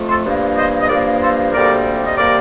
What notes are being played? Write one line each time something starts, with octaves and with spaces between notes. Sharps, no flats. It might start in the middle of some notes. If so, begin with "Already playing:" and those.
Already playing: F2 A3
A4 C5
G2 F3 A#3
C5 D#5
D#5
G2 F3 A#3 A#4 D5
A4 C5
D2 C3 G3 A#3 A#4 D5
D#5
C3 G3 A#3 A#4 D5